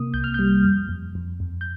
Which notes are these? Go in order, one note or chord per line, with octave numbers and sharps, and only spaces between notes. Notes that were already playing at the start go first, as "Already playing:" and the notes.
Already playing: C3 A#3 D#6
C2 G6
F6
G3 G6
F2
F2
F2
F2
G6